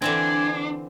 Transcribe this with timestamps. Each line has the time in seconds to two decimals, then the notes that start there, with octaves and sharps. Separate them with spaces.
0.02 D3 E3 C4 D4 G#5